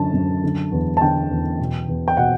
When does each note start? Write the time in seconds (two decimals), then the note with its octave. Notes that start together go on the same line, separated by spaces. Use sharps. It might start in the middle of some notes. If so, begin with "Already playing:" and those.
Already playing: F#2 D3 A5
0.14 F#2
0.44 D3
0.72 E2
0.97 A5
1.01 D3 G5
1.30 E2
1.59 B2
1.88 E2
2.08 G5
2.17 B2 F#5